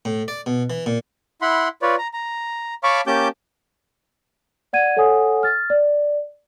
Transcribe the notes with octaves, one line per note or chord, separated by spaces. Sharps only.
A2
D5
B2
E3
A#2
E4 F#5 B5 C6
F4 B4 C#5 D5
A#5
A#5
C#5 F5 A5 B5 C#6 D6
A#3 C#4 G4 A5 D6 G6
D5 F#5 G#6 D#7
A4 C#5 F#5 G#5 D#6
F6 A6
D5